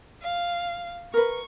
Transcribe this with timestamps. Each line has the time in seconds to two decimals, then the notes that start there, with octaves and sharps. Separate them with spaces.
0.22 F5
1.14 A#4 B4 C#6